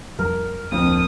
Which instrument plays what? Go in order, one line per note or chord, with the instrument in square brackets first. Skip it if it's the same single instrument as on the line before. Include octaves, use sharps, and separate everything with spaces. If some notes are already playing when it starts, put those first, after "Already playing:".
[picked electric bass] F2 G3 [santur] A#4
[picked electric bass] D1 A#3 D4 [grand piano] F2 [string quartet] D#6